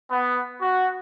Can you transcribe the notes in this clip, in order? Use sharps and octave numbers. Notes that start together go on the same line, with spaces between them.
B3
F#4